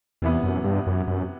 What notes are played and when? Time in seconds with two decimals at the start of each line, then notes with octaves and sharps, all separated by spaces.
0.22 E2 C3 E3 B3
0.43 F#2
0.64 G2
0.87 F#2
1.07 F#2